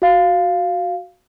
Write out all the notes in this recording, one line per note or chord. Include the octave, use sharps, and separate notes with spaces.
F#4 F5